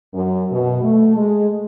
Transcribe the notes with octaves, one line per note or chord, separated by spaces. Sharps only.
F#2
B2
A3
G#3